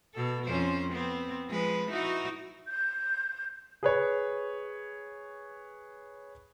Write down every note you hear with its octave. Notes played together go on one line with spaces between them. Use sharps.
B2 A4
F2 C#4 C5
B3 C4
F3 G#3 B4
D#4 E4 F#4
G6
G#4 B4 C#5